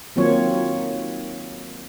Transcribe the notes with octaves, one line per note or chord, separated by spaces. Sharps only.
D#3 F#3 A#3 C4 F4 C#5